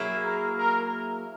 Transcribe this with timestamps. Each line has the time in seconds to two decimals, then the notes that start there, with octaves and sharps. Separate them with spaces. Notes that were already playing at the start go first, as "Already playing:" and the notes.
Already playing: F#3 A#3 E4 G#4
0.24 A#4
0.57 A#4